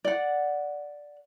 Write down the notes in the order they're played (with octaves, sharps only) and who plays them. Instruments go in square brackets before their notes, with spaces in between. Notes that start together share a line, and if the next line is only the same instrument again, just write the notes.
[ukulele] D5 F#5